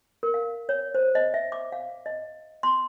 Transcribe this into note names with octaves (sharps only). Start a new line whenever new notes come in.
A#4
F5
C#5
C5
D#5
E5
D6
F5
D#5
C6